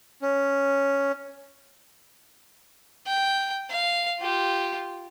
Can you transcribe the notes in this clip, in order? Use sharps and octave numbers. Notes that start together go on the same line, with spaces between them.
C#4
G5
F5
F4 G4